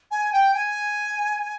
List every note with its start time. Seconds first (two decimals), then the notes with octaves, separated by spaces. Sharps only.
0.11 G#5
0.33 G5
0.54 G#5